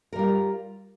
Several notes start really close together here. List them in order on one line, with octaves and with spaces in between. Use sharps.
A#4 G3 F4